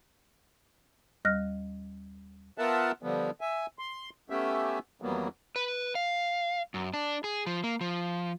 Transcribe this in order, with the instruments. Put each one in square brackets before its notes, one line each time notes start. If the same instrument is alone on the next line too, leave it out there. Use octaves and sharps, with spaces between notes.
[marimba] D#2 G3 D#5 F6 F#6 A#6
[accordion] B3 F4 A#4 E5 F#5 A5
D3 F3 G3 B3
E5 G#5
C6
A3 B3 C#4 G4 E5
F2 E3 F#3 G3 A#3 B3
[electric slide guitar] B4
F5
F#2
D4
G#4
F3
A#3
F3